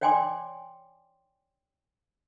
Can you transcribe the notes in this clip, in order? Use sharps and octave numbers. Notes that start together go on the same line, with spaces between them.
C#5 D5 G5 G#5 C6 D6